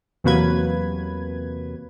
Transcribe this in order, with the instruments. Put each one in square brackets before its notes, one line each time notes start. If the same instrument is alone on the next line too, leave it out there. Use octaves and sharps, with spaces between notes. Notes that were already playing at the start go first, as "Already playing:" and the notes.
[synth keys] E2 C3 F#3 A#3 B4 G#6